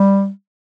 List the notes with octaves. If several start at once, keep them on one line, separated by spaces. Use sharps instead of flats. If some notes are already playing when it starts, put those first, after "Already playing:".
Already playing: G3